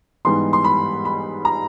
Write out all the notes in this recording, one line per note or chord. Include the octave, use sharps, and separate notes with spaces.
G#2 E3 G3 B3 D#4 C6
C6
B5
B5
A#5